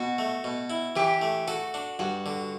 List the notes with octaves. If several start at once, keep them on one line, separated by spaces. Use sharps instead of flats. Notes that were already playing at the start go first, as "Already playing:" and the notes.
Already playing: B2 F#4
A3
B2
E4
E3 G4
A3
F#4 A4
D4
G2 F#4
D3